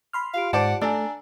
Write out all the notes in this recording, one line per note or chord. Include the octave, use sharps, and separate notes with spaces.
B5 C6 F6
F4 G4 F5 D7
G#2 C5 D5 F#5 A5 D6
A3 D4 A4 D5 G#5 A#5 E6